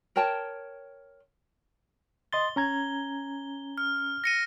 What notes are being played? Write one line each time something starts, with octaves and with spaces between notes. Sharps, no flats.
A#4 C#5 G5 A5
D#5 C6 A6 G7
C#4 A#5 G#6
F6
A#6 C#7 D#7